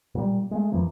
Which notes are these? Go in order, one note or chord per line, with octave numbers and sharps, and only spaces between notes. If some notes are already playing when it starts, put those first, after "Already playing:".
A#2 G3
G#3 A3
F2 E3 F3 A#3